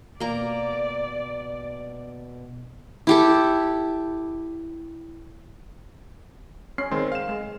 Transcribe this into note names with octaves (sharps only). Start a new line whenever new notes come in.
B2 A#3 D5 A#5
E4 G4 A4
C#4 C7
D#3 G#3 C4 C6
F5 E7
G#3